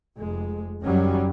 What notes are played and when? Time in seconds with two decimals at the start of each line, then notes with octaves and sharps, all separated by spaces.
0.18 F1 G#3
0.83 F#1 F#2 D#3 F#3 G3 C#4